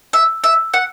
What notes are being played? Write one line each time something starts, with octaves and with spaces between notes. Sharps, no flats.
E5
E5
F#5